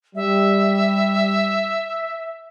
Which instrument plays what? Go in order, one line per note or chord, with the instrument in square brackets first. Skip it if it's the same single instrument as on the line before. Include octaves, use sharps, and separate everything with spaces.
[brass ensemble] G3 [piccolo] E5